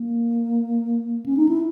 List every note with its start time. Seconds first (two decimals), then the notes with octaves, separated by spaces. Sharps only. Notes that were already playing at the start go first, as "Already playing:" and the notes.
Already playing: A#3
1.26 C#4
1.37 D#4
1.49 E4